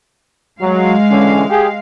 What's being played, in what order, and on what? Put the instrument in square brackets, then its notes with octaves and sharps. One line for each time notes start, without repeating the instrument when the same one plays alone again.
[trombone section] F#3 [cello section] G#3 F5
[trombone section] D3 E3 C#4
G4 G#4